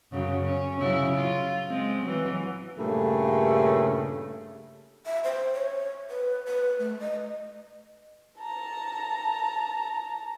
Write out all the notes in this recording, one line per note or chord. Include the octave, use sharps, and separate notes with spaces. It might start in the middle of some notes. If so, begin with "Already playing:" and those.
F#2 C#3 F#3
C#4
C#3 F#3 E4
F4
G#3 C4
E3 F#3
G2 A#2 C#3 A3
E5
C5
C#5
B4
B4
A3
D#5
A5 A#5